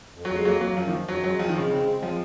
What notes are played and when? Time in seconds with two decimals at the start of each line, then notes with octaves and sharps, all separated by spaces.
0.14 F2
0.25 F#3
0.30 F2
0.36 G#3
0.45 F#3 A#3
0.61 F#3 A#3
0.76 F#2 F3
0.88 D#3
0.93 F3
1.09 F#2 F#3
1.24 F#3 G#3
1.39 F3 C4
1.49 D#3
1.55 C#3 G#3
1.71 C#3 C4
1.86 G#3
2.01 F3 G#3